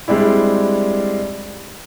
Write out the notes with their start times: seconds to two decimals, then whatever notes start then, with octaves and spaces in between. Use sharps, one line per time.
0.08 G3 G#3 C4 D4 E4